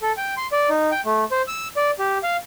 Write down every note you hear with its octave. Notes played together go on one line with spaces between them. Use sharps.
A4
G5
C6
D5
D#4
G5
A3
C5
E6
D5
G4
F5